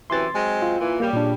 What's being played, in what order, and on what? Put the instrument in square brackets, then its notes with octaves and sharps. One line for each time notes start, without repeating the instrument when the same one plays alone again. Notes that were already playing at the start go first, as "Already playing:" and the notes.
[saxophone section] F#2 C3 E3 [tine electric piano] C6 A6
[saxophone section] F#3 G#3 C4
[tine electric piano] F4
[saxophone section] A#2 E3
[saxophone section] C#3 G3 [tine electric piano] A#3
[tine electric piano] A#2 D4